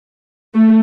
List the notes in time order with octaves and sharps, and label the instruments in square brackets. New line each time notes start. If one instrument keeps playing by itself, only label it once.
[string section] A3